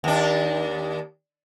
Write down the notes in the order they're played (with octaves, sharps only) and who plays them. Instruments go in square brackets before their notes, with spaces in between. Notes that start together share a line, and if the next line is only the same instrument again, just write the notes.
[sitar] D#2 D4